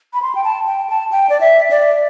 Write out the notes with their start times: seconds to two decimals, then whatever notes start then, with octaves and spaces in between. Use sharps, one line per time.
0.14 B5
0.22 C6
0.35 G5
0.44 A5
0.67 G5
0.89 A5
1.12 G5
1.30 D5
1.41 E5
1.71 D5